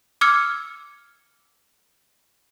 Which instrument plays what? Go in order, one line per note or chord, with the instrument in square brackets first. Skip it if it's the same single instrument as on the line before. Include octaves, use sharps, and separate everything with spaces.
[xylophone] D6 E6 F6 G#6 C#7